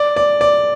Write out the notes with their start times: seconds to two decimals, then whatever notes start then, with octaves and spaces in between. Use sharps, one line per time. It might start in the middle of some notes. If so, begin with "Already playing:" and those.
Already playing: D5
0.16 D5
0.41 D5